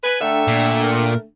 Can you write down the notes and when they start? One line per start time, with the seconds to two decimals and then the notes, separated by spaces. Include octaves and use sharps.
0.04 B4 G#5
0.21 D3 A3 D4 E5 G5 A#5
0.48 A#2
0.84 A#4